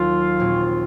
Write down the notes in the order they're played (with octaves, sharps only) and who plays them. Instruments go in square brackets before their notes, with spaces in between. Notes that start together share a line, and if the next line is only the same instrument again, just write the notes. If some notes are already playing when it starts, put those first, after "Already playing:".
Already playing: [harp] D#2 D#3 F#3 A#3 [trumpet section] F4
[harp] A#1 A#2 F#3 C4